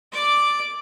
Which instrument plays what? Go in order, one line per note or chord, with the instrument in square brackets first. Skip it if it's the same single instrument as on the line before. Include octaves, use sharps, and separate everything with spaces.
[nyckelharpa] D5 D6